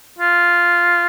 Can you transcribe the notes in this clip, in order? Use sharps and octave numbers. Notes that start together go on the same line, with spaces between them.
F4